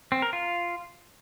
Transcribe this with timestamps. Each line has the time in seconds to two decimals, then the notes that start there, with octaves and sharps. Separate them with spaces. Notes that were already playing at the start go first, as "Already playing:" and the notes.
0.12 C4
0.22 A#4
0.33 F4